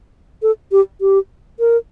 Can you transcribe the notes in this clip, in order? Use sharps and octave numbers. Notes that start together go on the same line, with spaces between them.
A4
G4
G4
A#4